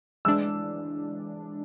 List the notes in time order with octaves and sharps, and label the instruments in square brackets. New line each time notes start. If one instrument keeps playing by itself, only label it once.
[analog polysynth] E3 G#3 D4 [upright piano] E6